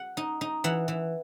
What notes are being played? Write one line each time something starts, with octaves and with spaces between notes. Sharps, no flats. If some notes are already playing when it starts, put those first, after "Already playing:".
Already playing: F#5
D#4
D#4
E3 F#5
E3